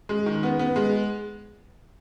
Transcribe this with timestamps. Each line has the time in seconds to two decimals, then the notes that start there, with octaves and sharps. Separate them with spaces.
0.09 G#3
0.26 D#3
0.43 B3
0.59 B3
0.76 G#3